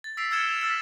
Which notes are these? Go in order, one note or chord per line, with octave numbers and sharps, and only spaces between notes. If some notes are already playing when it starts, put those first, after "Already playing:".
A6
E6 B6 C7 D7 F7
E6 F6 G#6 C#7 E7 G7
F7
E6 F6 A6 B6